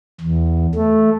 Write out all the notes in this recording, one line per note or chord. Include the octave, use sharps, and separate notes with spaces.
E2
A3